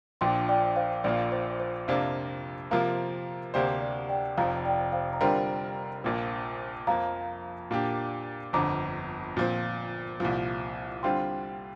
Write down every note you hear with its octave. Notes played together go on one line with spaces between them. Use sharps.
A#1 A#2 F3 D4 G5 C6
D5 G5
C5 F5
A#1 A#2 A#3 F4 D5
C5
C5
F2 C3 A#3 D4 F4
C3 F3 A#3 F4 A#4
D2 C3 A#3 G4 C5 D5
D5
D5 G5
F1 F2 F3 F5 A#5
D5 G5
C5 F5
A#5
D3 G3 C4 F4 A#4 D5 G5
A#1 A#2 F3 A#3
F2 F3 A#3 F5 A#5
A#2 A#3 D4 G4 D5
G1 F2 D3 A#5 D6
A#2 F3 C4
C2 A#2 F3
D3 G3 C4 F4 G5 C6